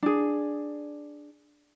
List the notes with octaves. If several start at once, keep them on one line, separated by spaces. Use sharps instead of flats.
D4 G#4